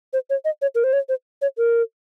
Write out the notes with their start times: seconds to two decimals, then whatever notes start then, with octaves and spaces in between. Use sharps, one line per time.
0.13 C5
0.30 C#5
0.45 D#5
0.62 C#5
0.75 A#4
0.84 C5
0.93 C#5
1.09 C5
1.42 C#5
1.58 A#4